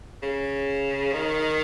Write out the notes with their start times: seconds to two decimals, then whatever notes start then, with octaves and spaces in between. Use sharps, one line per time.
0.23 C#3
1.13 D#3